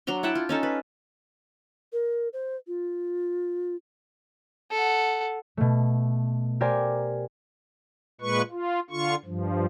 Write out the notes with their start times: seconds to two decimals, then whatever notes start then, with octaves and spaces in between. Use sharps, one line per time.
0.07 F#3 D4 A#5 C6
0.23 E4 F#5 G5 A5
0.35 F4
0.49 C#4 D#4 A4
0.63 B4
1.93 A#4
2.33 C5
2.67 F4
4.72 A4 F#5
5.57 B2 A3
6.61 G4 A#4 C5 D5 G#5
8.21 A#2 G#3 B4 C#6
8.51 F4
8.90 D3 F4 C#6
9.25 G2 F3